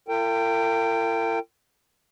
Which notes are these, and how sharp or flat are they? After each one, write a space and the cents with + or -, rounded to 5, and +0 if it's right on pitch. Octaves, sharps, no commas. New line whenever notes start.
F4 -45 A#4 -45 G5 +0